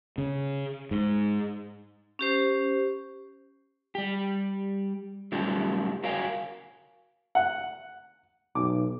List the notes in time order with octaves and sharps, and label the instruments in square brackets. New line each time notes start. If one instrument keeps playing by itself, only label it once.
[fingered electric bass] C#3
G#2
[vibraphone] C#4 G4 C5
[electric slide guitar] G3 G4
F#3 G3 A3 C#4 F4 G4
F#4 A#4 C#5 F5 G5 G#5
[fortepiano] F#5
[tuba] B1 [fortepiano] D6